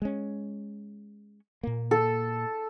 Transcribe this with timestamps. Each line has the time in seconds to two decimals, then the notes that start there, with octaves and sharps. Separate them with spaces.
0.02 G#3 C#4
1.63 A#2 A#3
1.91 A4